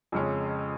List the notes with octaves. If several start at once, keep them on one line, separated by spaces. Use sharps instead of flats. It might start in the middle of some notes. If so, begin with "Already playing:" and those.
F2 C#3 G#3 C#4